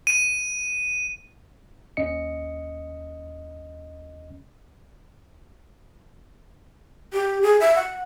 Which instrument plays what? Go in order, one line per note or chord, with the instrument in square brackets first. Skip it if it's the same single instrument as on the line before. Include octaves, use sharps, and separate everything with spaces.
[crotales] D#7
[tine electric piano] D#2 C#4 D#5 C#7
[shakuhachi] G4
G#4
E5
F#5